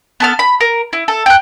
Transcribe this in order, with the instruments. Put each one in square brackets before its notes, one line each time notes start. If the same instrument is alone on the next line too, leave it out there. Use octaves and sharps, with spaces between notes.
[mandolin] B3 A4 F6
B5
A#4
E4
A4
G5 F#6